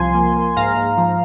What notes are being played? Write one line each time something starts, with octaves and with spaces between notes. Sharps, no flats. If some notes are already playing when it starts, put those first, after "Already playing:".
Already playing: C2 F3 G#5 C6
A#3
A#3
G#2 F5 A#5
G#2
F3